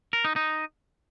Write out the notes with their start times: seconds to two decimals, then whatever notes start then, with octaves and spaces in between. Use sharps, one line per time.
0.13 A#4
0.25 D#4
0.36 D#4